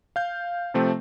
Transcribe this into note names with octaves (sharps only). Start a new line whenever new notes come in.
F5 G6
C3 F3 A3 C4